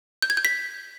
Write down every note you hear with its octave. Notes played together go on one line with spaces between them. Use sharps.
G6
G#6
G6
B6